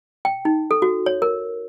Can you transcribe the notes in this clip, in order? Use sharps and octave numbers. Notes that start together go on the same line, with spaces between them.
G5
D#4
A4
F#4
C#5
A#4